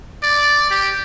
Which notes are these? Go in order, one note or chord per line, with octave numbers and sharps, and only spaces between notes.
D5
G4